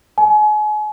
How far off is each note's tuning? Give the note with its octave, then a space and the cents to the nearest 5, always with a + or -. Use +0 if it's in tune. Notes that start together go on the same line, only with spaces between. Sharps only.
G#5 +35